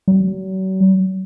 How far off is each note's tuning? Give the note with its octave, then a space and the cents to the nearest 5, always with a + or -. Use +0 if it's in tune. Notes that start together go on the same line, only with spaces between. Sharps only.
F#3 +40